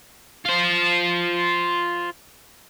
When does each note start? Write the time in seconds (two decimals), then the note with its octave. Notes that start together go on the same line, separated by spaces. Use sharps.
0.46 F4 C5